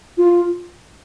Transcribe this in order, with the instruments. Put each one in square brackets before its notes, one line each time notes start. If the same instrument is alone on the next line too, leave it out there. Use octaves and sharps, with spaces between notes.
[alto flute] F4